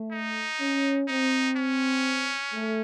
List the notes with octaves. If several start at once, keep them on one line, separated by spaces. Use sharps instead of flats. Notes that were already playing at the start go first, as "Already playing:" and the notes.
Already playing: A3
D#4
C#4
C4 D#4
C#4
A3